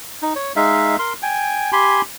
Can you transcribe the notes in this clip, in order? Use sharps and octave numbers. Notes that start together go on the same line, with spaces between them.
D#4
C#5
G#3 D#4 E5 F5
A#4 C6
G5 G#5
G4 G#5 B5 C6